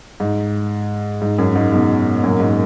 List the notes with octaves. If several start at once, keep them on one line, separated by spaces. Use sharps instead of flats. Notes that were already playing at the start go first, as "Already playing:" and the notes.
G#2
G#2
F#2
G#2
G#2 B2
F#2 A#2
G#2